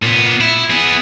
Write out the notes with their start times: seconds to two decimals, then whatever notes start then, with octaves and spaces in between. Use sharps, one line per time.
0.02 A#2 B3
0.41 E4
0.70 B3 G#4